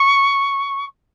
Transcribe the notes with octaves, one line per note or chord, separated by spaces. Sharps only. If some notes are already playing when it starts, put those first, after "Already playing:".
Already playing: C#6